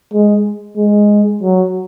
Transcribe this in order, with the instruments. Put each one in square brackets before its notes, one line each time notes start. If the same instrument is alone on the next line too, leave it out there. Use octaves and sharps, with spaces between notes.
[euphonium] G#3
G#3
F#3